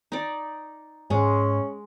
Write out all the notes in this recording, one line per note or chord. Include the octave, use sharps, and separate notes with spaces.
D#4 D5
G#2 G#3 C#4